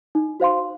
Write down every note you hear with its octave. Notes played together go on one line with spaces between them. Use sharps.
D#4
F#4 C5 F5 C6